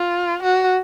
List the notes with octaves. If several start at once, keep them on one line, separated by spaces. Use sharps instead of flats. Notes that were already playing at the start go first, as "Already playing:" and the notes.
Already playing: F4
F#4